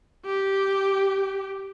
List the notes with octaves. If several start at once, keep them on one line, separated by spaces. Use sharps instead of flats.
G4